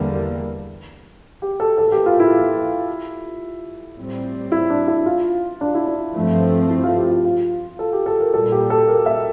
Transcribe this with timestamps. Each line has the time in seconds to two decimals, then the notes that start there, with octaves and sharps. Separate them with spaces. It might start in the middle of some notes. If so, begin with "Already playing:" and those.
Already playing: E2 D3 G3 A#3
1.42 G4
1.60 A4
1.78 A2 E3 A#3 A4
1.92 G4
2.06 F4
2.20 E4
3.97 A2 G3 C4
4.52 E4
4.70 D4
4.88 E4
5.06 F4
5.61 D4
5.74 E4
5.87 D4
6.15 G2 F3 A3 C4
6.70 E4
6.83 F4
6.97 G4
7.10 F4
7.25 F4
7.79 A4
7.93 G4
8.06 A4
8.20 A#4
8.34 A#2 G3 A#3 A4
8.52 G4
8.70 A4
8.88 A#4
9.06 E5